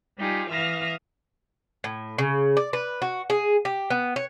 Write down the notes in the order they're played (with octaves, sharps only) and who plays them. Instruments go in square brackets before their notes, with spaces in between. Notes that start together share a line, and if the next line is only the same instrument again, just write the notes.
[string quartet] G3 D#4 F4 G4 G#4
E3 E5 F5 D#6 F6 A#6
[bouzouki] A2
C#3
D5
B4
F#4
G#4
G4
B3
C#5